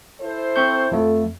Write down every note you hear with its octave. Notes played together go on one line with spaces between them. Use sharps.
E4 A4 C5
C4 C#6 G6
F2 A3